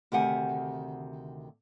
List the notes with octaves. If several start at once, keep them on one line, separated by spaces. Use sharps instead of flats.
D2 C3 D#3 G4 F#5 G#5